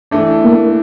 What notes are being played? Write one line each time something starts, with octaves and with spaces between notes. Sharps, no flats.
E3 A3 D4
A#3